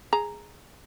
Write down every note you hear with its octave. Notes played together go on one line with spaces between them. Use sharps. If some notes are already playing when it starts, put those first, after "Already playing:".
G#4 A#5